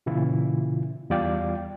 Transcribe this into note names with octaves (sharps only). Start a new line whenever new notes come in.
A#2 C#3 E3 E4 F4
E2 G3 F4 D5 F5 G5